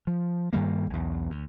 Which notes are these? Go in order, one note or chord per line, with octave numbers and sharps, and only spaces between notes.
F3
G2 D#3 G3 A#3
B1 E2
D2